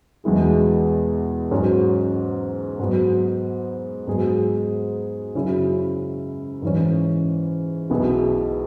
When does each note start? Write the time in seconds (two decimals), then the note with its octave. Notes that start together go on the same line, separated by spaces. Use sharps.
0.24 E2 B2 G#3 E4 G#4
1.51 G#2 F#3 C#4
2.79 G#2 F#3 B3
4.07 G#2 F#3 B3 G#4
5.35 F#2 C#3 F#3 C#4 E4
6.62 G#2 E3 C#4
7.90 B1 B2 B3 E4 G#4